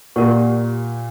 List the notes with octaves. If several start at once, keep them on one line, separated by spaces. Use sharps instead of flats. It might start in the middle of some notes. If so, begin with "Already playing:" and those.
A#2 G4 A#4 D5 F#5 C#6